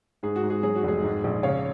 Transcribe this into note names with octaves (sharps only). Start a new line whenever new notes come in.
G#2 G#4
F#4
G#2
G#4
F#3 G#4
F#4
F1 G#4
G#2
A#1
C#3 C#5 F5